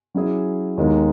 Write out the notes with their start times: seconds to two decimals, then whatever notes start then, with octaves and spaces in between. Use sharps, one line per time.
0.14 F#3 C#4 E4 G#4
0.77 D#2 D#3 G#3 B3 D#4